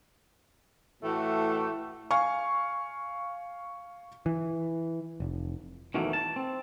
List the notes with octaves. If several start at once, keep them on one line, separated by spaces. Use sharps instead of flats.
A2 E3 A3 F#4
F5 G#5 C#6
E3
F1
B2 D#3 E3 F#3 A3 A#3
A5
C4